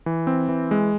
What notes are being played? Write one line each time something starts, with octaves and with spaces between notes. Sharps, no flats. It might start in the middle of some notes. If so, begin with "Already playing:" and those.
E3
C4
E3
G#3